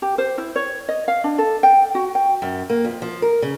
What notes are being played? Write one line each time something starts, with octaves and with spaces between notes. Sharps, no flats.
G4
C5
E4
C#5
D#5
F5
D4
A4
G5
F#4
G5
F#2
A#3
F2
F3
A#4
C#3